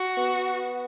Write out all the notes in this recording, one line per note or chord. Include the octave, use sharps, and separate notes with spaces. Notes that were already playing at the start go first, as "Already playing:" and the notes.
Already playing: F#4
B3